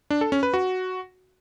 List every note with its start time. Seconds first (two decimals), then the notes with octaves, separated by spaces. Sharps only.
0.10 D4
0.21 A4
0.32 C#4
0.43 B4
0.54 F#4